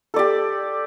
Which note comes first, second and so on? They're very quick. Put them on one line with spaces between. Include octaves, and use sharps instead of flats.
A4 D5 G4